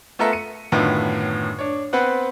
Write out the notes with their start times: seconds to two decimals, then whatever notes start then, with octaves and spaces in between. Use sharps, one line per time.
0.19 A3 B3 F4 A4 A#4 E5
0.32 C#7 D#7
0.72 F#2 A2 D3 D#3 B3 F4
1.59 D4 C#5
1.93 B3 C4 B4 F#5